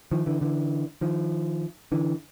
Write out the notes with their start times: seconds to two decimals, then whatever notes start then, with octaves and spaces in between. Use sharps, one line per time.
0.11 D#3 F3
0.26 D3 E3
0.41 D3 E3
1.01 D#3 F3
1.92 D3 E3